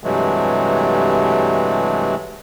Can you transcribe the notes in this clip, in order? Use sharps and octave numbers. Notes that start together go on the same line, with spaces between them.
G2 C3 E3 F#3 G#3 A3